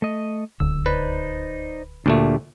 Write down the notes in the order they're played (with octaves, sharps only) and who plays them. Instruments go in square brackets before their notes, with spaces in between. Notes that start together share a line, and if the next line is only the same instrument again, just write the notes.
[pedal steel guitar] A3 D#5
[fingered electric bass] D1 C#2 D3 [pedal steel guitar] E6
[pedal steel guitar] D#4 C5 D5 [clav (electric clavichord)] B4
[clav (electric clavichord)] D2 A#2 A3 [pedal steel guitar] D4 G4